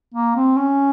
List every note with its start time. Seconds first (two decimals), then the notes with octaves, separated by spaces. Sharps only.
0.14 A#3
0.36 C4
0.57 C#4